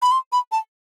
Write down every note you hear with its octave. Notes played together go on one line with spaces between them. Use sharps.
B5
C6
B5
A5